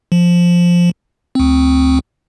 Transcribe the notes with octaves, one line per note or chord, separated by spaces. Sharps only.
F3
D2 C4